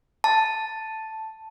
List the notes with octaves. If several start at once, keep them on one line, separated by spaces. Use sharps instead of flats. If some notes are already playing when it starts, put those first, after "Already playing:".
A5